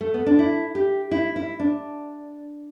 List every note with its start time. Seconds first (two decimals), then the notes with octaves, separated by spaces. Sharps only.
0.01 A3
0.14 B3
0.26 D4
0.39 E4
0.75 G4
1.11 E4
1.36 E4
1.59 D4